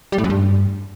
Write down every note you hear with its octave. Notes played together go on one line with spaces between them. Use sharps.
G3
A2
F#2
G2